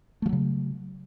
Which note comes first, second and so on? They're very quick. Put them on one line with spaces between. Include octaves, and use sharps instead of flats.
A3 F3 F#3 C#3